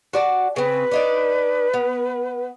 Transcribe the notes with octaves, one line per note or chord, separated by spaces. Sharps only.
F#4 D5 A5
C#3 C4 B4
D4 D#4 D5
B3